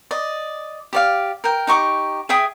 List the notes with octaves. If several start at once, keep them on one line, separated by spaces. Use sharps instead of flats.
D5 D#5
G4 D5 F5
A#4 G5
D#4 G4 C#6 D6
G#4 E5 G5 D#6